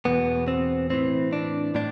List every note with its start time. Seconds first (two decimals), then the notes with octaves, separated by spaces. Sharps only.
0.05 E2 B2 B3
0.48 C4
0.90 A2 E3 C4
1.33 D4
1.75 A2 D4